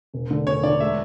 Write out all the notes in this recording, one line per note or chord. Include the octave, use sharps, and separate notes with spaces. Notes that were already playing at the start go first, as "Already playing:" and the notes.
E1
D3
E1 C#5
D2 D5
G#3 E5